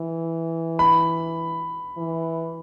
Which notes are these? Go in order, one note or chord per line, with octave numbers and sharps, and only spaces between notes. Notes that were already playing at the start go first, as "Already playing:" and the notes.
Already playing: E3
B5
E3